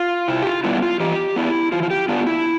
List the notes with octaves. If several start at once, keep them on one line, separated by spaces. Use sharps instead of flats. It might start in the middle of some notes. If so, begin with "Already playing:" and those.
Already playing: F4
C3 E4
G4
F4
G3 B3 D4 E4
F4
E3 G4
B3 D4 E4
E3 F4
F4
G4
B3 D4 F4
E4